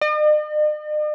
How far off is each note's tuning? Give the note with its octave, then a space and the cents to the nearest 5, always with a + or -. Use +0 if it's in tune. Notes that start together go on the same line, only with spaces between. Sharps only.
D#5 -45